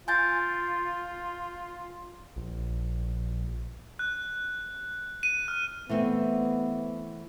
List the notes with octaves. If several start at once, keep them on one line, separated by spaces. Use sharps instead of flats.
F4 G#5 G6 A6
A#1
F#6
D#7
F6
E3 A3 B3 C4